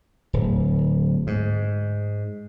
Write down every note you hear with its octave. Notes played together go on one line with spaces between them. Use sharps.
D1
G#2